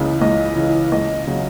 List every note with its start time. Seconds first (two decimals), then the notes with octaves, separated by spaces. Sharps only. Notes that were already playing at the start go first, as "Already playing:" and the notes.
Already playing: C#2 C#3 E3
0.21 C#2 D#5
0.56 C#3 E3
0.92 C#2 D#5
1.27 C#3 F#3